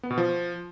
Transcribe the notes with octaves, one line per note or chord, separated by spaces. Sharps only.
B3
B2
F3